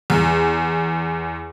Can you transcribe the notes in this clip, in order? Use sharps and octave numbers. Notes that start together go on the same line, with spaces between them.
E2